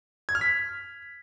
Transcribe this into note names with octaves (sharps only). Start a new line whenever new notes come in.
G#6
F6
B6